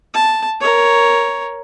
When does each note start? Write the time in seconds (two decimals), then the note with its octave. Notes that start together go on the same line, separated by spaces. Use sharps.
0.14 A5
0.60 A#4 C#5